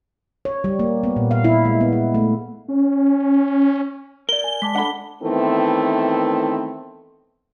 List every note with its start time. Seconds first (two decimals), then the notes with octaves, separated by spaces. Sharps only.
0.45 C#5
0.64 G3
0.79 A#3
1.03 B3
1.16 A#2
1.31 F5
1.44 E4
1.65 G#3
1.81 B3
1.93 G#3
2.14 A3
2.68 C#4
4.29 A#4 D5 G7
4.44 G#5
4.62 G#3 A5 D6 B6
4.76 D4 A4 F#5 B5
5.21 D#3 E3 A3 B3 C4